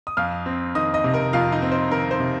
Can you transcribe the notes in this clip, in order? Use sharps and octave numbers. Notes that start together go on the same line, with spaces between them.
D#6
F2 F5 F6
C4
D#3 D#5 D#6
D#5 D#6
C3
A#4 A#5
F2 F4 F5
D#4 D#5
C4
C5
D#3 A#4
C5
C3